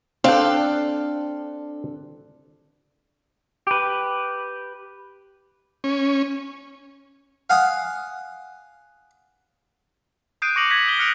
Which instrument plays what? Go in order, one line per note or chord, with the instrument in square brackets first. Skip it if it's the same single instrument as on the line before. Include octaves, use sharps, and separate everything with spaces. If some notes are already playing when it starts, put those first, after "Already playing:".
[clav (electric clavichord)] C4 G5 [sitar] D4 A4 [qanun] F5
[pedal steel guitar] G4 B4
[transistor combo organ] C#4
[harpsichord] F5 F#5 G#5 D#6
[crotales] D#6 F#6 G6 C7 D7 D#7
C#6 D6 A#6 C#7 F7 F#7
G#6 A#6 B6 F#7
D#6 G7
F6 F#6 C#7 D7 F7